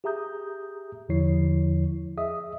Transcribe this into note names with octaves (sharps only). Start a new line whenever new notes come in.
G4 G#4 E5 A#5 D#6 G6
E2 D3 F3 E4 C#5 C7
G#4 D#5 E5 D#6